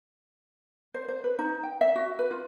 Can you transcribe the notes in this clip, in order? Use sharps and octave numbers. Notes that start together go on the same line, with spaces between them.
C5
C5
B4
D#4
G5
E5
F#4
B4
F4